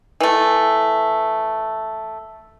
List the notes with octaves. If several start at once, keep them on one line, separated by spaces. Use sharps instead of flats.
E3 A3